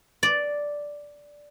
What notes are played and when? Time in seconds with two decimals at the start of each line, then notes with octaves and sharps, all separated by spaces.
0.23 D5